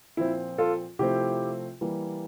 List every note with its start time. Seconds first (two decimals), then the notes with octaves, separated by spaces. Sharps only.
0.17 A#2 F3 C4 E4
0.58 F4 A4
0.99 C3 F3 A3 C4 E4 G4
1.81 E3 G3 A#3